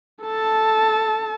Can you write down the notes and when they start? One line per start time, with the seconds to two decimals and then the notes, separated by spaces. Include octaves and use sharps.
0.24 A4 A5